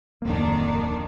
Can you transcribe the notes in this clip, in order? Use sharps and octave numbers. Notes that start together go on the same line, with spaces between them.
D1 F2 D#3 A#3 D4